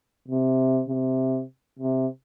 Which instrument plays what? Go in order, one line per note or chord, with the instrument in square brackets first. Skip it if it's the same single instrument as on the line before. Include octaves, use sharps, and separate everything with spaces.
[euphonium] C3
C3
C3